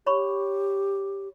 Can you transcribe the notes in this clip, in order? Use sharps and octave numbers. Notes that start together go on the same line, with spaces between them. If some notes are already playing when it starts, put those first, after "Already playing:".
G4 C#5 B5 C#6